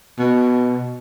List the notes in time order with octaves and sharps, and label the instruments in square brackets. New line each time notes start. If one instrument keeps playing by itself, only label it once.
[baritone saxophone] B2